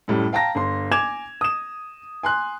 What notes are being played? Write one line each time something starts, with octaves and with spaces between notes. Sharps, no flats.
F#2 A2 G3
F5 G5 A5 A#5 A#6
G1 C6
G#5 D6 G#6 E7 F7
D#6 E7
G#5 C6 F#6